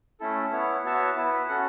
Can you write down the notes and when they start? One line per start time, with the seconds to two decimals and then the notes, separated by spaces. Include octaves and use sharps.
0.20 A3 C#4 E4 A4
0.52 B3 E4 C#5
0.84 B3 F#4 C#5 E5 A5
1.16 B3 E4 B4
1.48 C#4 F#4 A4 F#5